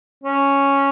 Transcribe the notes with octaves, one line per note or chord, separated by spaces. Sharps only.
C#4